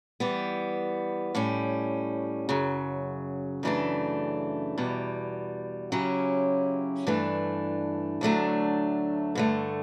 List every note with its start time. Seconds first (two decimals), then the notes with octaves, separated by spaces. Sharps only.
0.20 E3 G3 B3
1.35 A2 G3 C#4
2.49 F#2 C#3 F#3
3.63 F#2 C#3 E3 A3 D4
4.78 E2 B2 G3
5.92 C#3 F#3 C#4 E4 G4
7.07 G2 E3 A3 D4
8.21 D2 D3 F#3 A3 D4
9.35 G2 D3 A3